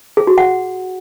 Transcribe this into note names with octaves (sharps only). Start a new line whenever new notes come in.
G#4
F#4
F#5